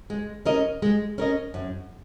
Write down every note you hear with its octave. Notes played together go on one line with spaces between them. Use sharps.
G#3
C#4 A#4 D#5
G#3
C#4 A#4 D#5
F#2